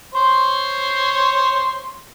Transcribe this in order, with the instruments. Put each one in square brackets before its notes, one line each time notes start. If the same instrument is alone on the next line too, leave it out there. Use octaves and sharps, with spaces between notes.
[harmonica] C5 C#5 C6